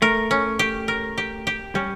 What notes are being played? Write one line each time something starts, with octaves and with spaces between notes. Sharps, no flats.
A3 A#4
C#4
G4
A#4
G4
G4
G3 C#4